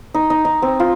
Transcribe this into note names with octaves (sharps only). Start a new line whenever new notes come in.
D#4
D#4
D#4
C4
F4